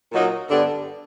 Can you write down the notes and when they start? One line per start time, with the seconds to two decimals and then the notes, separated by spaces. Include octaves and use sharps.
0.12 A#2 F#3 A#3 D#4
0.50 G2 D3 G3 B3 D4